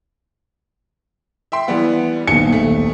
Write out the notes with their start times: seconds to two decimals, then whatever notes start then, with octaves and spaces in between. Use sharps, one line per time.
1.52 E5 G5 C6
1.68 E3 G3 B3
2.27 D#1 B1 C#7
2.52 A3